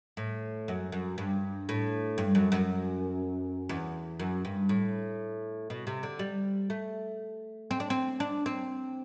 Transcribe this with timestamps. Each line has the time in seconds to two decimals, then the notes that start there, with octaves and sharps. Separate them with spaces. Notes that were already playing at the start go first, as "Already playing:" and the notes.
0.17 A2
0.68 F#2
0.92 F#2
1.18 G2
1.69 A2
2.18 G2
2.35 F#2
2.52 F#2
3.69 E2
4.20 F#2
4.45 G2
4.69 A2
5.70 B2
5.87 C3
6.03 D3
6.19 G3
6.70 A3
7.71 C4
7.80 D4
7.90 C4
8.20 D4
8.46 C4